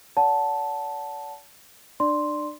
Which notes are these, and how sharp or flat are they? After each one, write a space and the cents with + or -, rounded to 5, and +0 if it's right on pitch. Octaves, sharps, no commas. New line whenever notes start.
D5 -45 F#5 +0 A5 -5
D4 +35 D5 +0 C6 +0